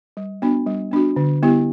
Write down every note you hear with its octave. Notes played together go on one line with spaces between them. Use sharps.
G3
B3 D4 F#4
G3
B3 D4 F#4
D3
G3 B3 E4 G4